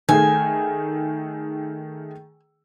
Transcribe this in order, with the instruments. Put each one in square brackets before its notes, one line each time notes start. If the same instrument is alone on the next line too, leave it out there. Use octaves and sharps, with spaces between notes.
[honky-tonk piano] D#3 A3 G#4 [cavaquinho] G#5